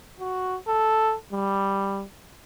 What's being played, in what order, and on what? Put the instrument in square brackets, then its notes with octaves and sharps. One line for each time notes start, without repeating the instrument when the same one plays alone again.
[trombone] F#4
A4
G3